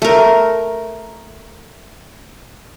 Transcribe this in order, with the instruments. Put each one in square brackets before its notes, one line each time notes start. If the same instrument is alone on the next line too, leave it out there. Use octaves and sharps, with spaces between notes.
[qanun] A3 A#4